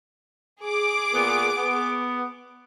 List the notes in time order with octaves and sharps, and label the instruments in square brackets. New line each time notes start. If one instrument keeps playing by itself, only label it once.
[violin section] G#4 D6
[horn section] A#2 B3
B3